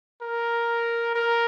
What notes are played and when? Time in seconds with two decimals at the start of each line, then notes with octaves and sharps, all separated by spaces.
0.22 A#4
1.15 A#4